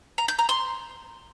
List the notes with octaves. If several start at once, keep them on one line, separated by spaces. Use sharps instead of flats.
A#5
G6
A#5
C6